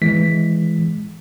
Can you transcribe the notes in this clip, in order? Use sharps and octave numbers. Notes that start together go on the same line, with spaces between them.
E3 G#3 B6